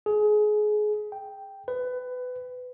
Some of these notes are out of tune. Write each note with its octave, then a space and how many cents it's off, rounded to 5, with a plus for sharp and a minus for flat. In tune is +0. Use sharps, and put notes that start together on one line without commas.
G#4 +25
G5 +0
B4 +20